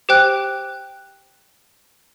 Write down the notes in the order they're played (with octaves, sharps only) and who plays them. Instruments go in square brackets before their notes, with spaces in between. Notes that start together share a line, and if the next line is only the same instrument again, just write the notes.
[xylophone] G4 C5 G5 F#6